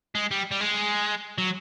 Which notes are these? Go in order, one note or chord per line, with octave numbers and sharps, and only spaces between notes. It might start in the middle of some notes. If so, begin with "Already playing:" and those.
G#3
G3
G3
G#3
F#3